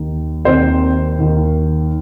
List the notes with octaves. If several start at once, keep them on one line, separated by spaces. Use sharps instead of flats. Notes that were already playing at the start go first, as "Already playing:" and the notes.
Already playing: D#2 D#3
D#2 D#3 C4 C5
D#2 D#3